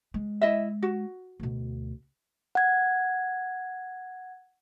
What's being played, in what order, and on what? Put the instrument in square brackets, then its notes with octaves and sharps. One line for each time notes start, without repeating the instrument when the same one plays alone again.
[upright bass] G#3
[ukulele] E4 D#5 E5
F#4
[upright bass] D2 B2
[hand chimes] F#5 G#6